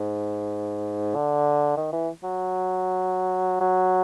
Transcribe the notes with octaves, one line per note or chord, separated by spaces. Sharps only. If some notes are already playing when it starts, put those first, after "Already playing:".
Already playing: G#2
D3
D#3
E3
F#3
F#3